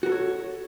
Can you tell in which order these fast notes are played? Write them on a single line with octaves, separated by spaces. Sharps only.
F#4 A#4 A4 C#5